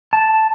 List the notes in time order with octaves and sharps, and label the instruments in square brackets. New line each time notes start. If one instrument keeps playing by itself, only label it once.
[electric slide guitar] A5